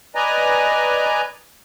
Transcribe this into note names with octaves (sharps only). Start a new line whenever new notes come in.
B4 D5 D#5 G#5 A#5